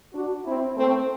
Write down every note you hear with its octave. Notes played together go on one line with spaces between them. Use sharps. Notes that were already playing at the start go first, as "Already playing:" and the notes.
D4 F#4
C4 E4
A3 C4